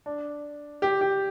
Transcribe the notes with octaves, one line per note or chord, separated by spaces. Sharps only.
D4
G4
G4